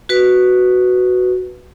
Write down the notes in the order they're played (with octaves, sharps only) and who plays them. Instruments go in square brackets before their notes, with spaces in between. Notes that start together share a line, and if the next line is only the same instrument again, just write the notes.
[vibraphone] F#4 B4